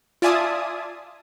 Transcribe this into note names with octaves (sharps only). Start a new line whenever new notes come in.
F4 D5 E5 G#5 A5 D#6